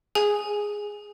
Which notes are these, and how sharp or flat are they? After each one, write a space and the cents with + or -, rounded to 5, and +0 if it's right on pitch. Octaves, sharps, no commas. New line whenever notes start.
G#4 +0 G#5 +0